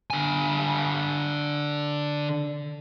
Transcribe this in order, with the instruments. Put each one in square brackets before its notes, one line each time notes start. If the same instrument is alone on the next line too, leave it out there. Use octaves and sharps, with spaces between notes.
[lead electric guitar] D3 G#5